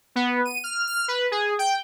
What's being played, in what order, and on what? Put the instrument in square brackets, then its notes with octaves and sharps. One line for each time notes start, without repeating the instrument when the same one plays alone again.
[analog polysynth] B3
D#7
F6
F6
B4
G#4
G5